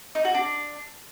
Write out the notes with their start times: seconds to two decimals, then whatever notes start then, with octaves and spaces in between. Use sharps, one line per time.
0.15 D#4
0.25 F#4
0.34 D4